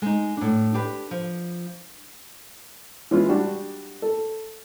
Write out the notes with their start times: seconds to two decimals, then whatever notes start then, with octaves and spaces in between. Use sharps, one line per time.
0.02 G#3 D#4
0.37 A2 D4
0.74 D4 G4 B4
1.11 F3
3.11 E3 G#3 C#4 F4
3.29 G3 D4 F#4
4.02 A4